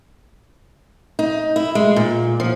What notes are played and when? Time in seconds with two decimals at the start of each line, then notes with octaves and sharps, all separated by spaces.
1.19 D#4
1.56 E4
1.75 G#3
1.96 A#2
2.40 F3